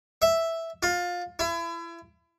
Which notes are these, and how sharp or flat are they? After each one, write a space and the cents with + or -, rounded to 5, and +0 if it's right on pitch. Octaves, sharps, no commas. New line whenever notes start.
E5 +0
F4 +20
E4 +35